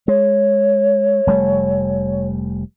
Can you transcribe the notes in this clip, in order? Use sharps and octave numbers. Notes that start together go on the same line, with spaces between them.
G#3 C#5
F1 G3 A3